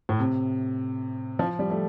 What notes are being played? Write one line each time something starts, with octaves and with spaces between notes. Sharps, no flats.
A2
C3
F3
G3
A3